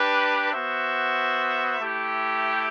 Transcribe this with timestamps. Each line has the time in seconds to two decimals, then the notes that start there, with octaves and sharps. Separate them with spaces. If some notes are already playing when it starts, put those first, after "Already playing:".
Already playing: D4 G4 B4
0.52 B3 F#4 C5 E5
1.80 A3 E4 G4